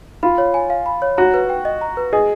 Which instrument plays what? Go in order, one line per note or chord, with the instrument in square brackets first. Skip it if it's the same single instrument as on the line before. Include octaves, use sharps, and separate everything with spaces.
[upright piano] F4 [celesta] B5
[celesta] C#5
G#5
F5
B5
C#5
[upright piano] F#4 [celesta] A#5
[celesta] B4
G5
D#5
A#5
B4
[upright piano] G#4 [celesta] D#5